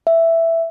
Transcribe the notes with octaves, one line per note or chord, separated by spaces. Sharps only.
E5